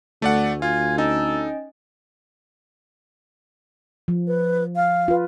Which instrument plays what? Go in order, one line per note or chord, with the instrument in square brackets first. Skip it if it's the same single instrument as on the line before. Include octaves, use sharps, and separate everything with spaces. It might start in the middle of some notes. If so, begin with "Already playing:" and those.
[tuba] D2 [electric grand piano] A3 D5 F#5
[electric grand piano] F4 [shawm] G#5
[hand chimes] C#4 D#5 G#5 [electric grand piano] D#4 [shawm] A4
[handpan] F3
[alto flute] B4
F5
[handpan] F4 B4